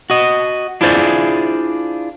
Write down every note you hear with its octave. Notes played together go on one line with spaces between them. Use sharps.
F#4 D#5
D4 E4 F4 G#4 C5 D5